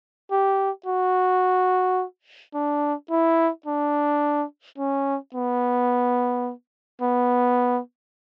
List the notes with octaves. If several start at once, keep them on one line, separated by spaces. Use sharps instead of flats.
G4
F#4
D4
E4
D4
C#4
B3
B3